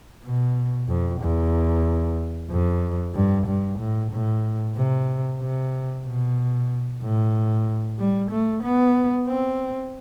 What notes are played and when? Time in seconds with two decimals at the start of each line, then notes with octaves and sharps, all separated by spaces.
0.24 B2
0.89 F2
1.21 E2
2.50 F2
3.15 G2
3.47 G2
3.79 A2
4.11 A2
4.76 C3
5.40 C3
6.05 B2
7.02 A2
7.99 G3
8.31 A3
8.63 B3
9.27 C4